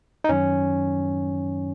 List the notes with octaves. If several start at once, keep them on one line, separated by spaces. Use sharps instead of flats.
D#4
F#2 D#3 F#3 C#4